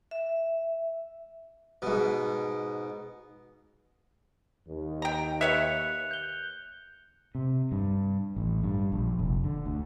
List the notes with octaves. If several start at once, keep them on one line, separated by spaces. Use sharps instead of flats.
E5
G#2 B2
D#2
G5 A#5
B4 C#5 E5 F#6 C#7 F7
G6 G7
C3
G2
A1
G2
A#1
F1
D3
D2